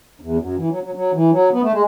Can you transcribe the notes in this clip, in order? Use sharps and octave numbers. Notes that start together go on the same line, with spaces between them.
E2
F#2
E3
F#3
F#3
F#3
E3
F#3
B3
A3
G#3